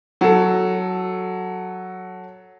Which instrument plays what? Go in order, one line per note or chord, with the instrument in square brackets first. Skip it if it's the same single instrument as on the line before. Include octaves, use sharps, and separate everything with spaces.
[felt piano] F#3 A4